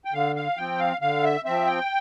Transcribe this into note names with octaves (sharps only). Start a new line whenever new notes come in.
G5
D3 F5
F5
F3 C4 G5
F5
D3 F5
E5
F3 C4 E5
G5